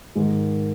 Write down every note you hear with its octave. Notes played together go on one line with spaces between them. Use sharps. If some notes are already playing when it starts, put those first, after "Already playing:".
G#2 D#3 G#3